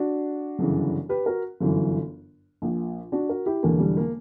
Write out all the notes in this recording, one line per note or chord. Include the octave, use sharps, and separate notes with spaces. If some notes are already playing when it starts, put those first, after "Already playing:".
Already playing: D4 F#4
G1 F#2 C#3 E3
G4 B4
F#4 A#4
G1 F#2 E3
A#1 A#2
D4 F#4
F#4 A#4
E4 G4
E1 E2 D3 A#3
G3
A#3